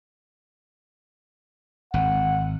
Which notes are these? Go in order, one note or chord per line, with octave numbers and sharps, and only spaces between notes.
G#1 F#5